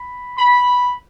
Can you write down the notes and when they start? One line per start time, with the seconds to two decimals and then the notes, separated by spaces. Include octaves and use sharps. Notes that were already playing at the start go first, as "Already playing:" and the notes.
Already playing: B5
0.38 B5